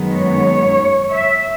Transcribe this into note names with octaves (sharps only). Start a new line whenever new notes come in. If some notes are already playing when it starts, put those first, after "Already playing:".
Already playing: F#2 D#3 G#3 B3
C#5
E5